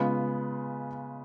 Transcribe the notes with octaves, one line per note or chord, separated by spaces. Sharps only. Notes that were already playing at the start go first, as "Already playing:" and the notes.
Already playing: C#3 G#3 B3 F4